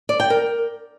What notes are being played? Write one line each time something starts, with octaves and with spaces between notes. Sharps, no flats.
D5
G5
A#4